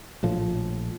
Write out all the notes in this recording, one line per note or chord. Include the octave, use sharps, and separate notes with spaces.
A#1 A2 F3